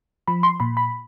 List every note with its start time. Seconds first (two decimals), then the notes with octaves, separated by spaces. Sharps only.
0.28 F3 B5
0.43 C6
0.60 A#2 B5
0.77 B5